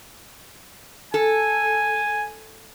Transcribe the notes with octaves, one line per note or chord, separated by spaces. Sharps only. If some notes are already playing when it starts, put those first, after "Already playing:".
A4 G#5